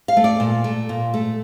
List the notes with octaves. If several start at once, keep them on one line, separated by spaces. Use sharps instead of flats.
F5
A3
D5
A#2
A3
A#2
A3